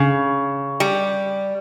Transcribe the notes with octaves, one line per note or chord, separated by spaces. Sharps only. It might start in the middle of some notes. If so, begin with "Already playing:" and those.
Already playing: C#3
G3